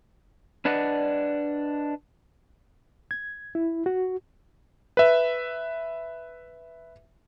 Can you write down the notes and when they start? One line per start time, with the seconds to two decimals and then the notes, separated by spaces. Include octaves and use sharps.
0.65 D4 B4 D5 D#5 F#5
3.11 G#6
3.55 E4
3.86 F#4
4.97 B4 E5